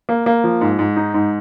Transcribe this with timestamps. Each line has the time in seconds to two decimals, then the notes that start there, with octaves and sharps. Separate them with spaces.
0.09 A#3
0.26 A#3
0.44 F3
0.61 G#2
0.79 G#2
0.96 D#4
1.14 G#2